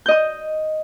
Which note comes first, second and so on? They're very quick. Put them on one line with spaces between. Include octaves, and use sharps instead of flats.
G6 D#5 D#6